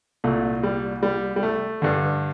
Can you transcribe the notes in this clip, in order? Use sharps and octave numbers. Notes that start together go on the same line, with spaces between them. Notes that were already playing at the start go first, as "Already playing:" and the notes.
C2 A#2 A3
G3
G3
G3
A3
G2 D3